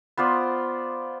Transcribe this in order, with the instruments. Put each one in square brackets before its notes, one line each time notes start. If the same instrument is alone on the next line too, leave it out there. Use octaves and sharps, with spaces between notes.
[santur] B3 F4 C5 D5